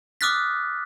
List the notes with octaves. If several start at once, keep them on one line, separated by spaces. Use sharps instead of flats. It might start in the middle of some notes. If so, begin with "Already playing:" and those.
D6 D#6 F6 F#6 A6 B6